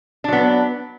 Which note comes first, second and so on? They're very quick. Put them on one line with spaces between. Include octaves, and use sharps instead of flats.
D4 F#3 B3